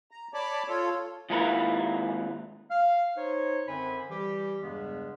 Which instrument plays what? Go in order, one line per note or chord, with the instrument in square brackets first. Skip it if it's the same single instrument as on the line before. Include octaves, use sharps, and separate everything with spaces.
[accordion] A#5
C#5 D5 A5 B5 D6
F4 A4 C#5
[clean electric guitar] D#2 G#2 E4 F4 A#4 B4
[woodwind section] F5
D#4 C5 C#5
F#2 D3 C4 C5 G#5 B5
E3 G3 G4
E2 G2 C#3 G3 G#3 B3